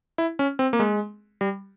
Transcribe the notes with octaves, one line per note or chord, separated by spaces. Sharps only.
E4
C#4
C4
A#3
G#3
G3